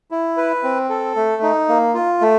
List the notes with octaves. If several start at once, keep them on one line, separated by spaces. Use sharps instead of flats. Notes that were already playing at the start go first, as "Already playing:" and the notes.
E4
B4
C4
A4
A3
D#4
A#3
F4
A3